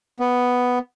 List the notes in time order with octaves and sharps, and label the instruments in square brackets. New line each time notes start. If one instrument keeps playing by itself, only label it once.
[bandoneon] B3